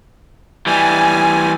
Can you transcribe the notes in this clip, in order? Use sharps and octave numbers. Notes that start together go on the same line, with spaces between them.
E3 G3 G#5